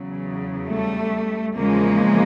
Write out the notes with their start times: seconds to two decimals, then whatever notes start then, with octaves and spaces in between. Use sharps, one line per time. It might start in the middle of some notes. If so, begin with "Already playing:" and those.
Already playing: E2 C#3 F#3
0.69 G3 A3
1.56 E2 C#3 F3 G#3 A#3